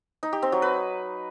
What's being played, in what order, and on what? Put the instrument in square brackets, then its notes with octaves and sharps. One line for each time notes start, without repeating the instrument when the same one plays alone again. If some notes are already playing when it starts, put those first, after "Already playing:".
[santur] D#4
G4
C4
F#3
B4